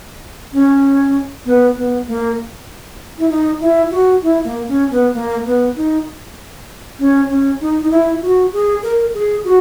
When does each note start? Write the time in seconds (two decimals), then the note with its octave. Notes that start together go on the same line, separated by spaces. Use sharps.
0.53 C#4
1.45 B3
1.76 B3
2.07 A#3
3.18 E4
3.30 D#4
3.60 E4
3.91 F#4
4.22 E4
4.44 A#3
4.68 C#4
4.91 B3
5.14 A#3
5.45 B3
5.76 D#4
6.99 C#4
7.29 C#4
7.60 D#4
7.82 D#4
7.91 E4
8.22 F#4
8.53 G#4
8.83 A#4
9.14 G#4
9.44 F#4